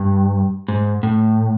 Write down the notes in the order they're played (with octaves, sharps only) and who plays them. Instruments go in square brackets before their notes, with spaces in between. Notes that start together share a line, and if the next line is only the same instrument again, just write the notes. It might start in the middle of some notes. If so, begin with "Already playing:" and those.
Already playing: [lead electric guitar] G2
G#2
A2